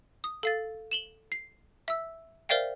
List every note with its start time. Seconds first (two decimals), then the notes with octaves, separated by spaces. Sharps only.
0.24 D#6
0.43 A4 F5 A6
0.91 E7 F#7 G7
1.32 C7
1.88 E5 E6
2.49 A#4 C5 D5 E5 F5 G5